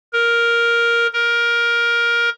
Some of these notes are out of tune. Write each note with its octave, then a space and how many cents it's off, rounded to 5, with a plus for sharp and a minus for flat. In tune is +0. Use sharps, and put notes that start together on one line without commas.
A#4 +5
A#4 +15